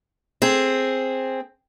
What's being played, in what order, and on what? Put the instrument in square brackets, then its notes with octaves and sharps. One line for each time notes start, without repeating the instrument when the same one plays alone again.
[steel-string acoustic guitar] C4 G#4